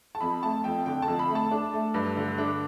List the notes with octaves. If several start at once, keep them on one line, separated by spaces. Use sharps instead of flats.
A5
F2 B5
A3 A5
F2 G5
D3 G5
A5
F2
B5
A3
A5
D4
A3
G2
D3
D4